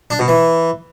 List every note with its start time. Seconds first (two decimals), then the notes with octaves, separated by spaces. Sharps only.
0.10 D4
0.19 B2
0.28 E3